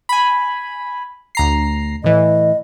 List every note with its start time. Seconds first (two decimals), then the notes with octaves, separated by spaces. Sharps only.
0.09 G#5 B5
1.35 D2 A#5 C7
2.04 A2 E3 D#5